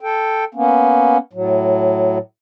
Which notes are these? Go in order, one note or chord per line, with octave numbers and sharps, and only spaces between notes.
A4 G5
A#3 B3 C#4
A2 F#3